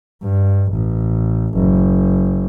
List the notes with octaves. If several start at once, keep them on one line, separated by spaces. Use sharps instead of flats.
G2
A1
F#1